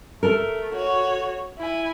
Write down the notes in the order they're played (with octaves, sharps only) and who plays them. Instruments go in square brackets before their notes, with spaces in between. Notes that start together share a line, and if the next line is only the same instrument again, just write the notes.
[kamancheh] A3 [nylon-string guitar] A4 A#4
[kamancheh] F#4 C#5
E4 G#5